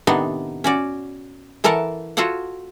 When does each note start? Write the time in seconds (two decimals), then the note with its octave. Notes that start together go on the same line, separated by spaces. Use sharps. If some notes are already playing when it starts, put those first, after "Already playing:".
0.07 A2 C3 D#3 B3 D4 D#4
0.64 C#4 F#4 D5
1.64 E3 A4 A#4 F#5 A5
2.17 F4 F#4 A4 C#5 F#5